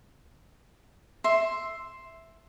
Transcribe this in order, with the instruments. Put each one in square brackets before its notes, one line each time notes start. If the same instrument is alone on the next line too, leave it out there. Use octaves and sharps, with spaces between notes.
[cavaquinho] E5 C6